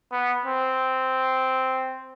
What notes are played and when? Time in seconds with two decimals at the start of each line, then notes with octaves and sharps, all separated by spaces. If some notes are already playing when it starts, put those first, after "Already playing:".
0.12 B3
0.46 C4